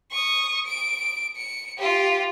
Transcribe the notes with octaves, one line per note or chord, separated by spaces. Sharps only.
C#6 D#6
D7
C#7
F4 G4